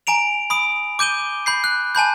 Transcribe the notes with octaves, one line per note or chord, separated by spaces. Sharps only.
G#5 A#5 D7 F7
B5 D#6 D7
D6 G6 D#7 G7
B5 G6 C7
F#6
G#5 A5 B5 G6